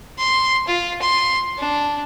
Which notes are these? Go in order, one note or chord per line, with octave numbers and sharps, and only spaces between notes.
C6
F4
C6
D4